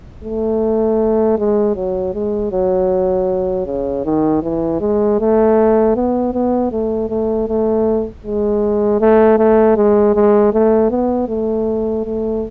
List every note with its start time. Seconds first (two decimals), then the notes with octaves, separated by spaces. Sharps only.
0.24 A3
1.39 G#3
1.76 F#3
2.14 G#3
2.52 F#3
3.66 C#3
4.05 D#3
4.43 E3
4.81 G#3
5.20 A3
5.96 B3
6.33 B3
6.72 A3
7.10 A3
7.48 A3
8.24 G#3
9.01 A3
9.38 A3
9.77 G#3
10.15 G#3
10.54 A3
10.90 B3
11.29 A3
12.05 A3